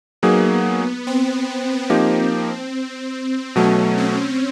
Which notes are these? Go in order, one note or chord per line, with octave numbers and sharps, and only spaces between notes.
F#3 A#3 B3 D#4 G#4
C4
F3 A#3 C4 D#4 G4
B2 F#3 A3 C#4
C4